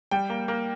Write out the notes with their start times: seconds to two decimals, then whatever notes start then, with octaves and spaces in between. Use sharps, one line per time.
0.11 G3 G5
0.30 A#3
0.48 A#3